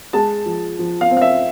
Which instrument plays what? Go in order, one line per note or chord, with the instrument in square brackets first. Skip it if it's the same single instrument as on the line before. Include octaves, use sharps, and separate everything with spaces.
[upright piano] G#3 A5
F3
F3
F5
C4
F5
E5